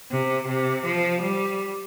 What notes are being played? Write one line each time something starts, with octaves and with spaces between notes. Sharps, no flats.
C3
C3
F3
G3